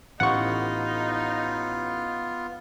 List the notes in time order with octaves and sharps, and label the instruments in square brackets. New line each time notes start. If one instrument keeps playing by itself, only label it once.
[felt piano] A1 A2 G4 [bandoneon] B3 F4 [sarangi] D#4 [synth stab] F#5 C#6